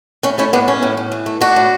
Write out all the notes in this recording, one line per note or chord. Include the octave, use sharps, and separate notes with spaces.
A2 C#4
A3 C#4 E4
A2 B3 D4
E3 C#4
A2
A2
E3
A3
A3 D4 F#4
A2